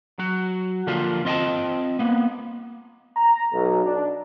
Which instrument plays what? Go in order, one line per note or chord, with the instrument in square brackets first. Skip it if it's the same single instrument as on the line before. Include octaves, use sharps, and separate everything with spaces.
[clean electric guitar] F#3 F#4
D3 F3 A#3 D4 F4 G4
C4 F4 D#5 F5 G5 A5
A#3 B3
[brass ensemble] A#5
B1
D4